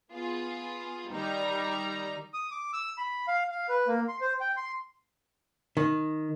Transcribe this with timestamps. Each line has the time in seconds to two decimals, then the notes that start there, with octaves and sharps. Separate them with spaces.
0.12 B3 F4 G#4
1.10 D#3 G3 D#4 A#5
2.34 D#6
2.51 D6
2.73 E6
2.98 B5
3.28 F5
3.51 F5
3.69 B4
3.88 A#3
4.08 C6
4.21 C5
4.41 G5
4.57 C6
5.77 D#3